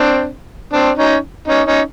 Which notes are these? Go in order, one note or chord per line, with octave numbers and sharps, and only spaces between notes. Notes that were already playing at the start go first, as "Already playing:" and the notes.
Already playing: C4 D4
C4 D4
C#4 D#4
C#4 D#4
C#4 D#4